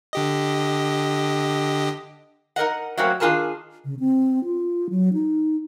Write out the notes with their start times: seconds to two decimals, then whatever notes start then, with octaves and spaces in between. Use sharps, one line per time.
0.13 D3 G4 D#5
2.56 D#4 A#4 D#5 F#5
2.97 F#3 A3 A#3 C4 C#4 F#4
3.20 D#3 D4 F4 G#4 A#4 A5
3.85 C#3
4.00 C4
4.44 F4
4.90 F#3
5.13 D#4